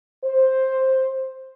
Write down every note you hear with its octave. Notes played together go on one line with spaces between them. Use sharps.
C5